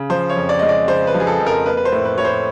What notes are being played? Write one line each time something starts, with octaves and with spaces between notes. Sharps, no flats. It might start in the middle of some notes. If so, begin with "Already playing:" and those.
Already playing: C#3
F3 C5
C#5
F2
D5
G#3 D#5
D5
C#3 C5
B4
F3
G#4
A4
F2
A#4
A#3 B4
B4
C5
A2
B4
A2 C#5
C5